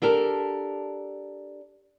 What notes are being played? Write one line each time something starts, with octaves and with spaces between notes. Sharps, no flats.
D4 G4 A4 A#4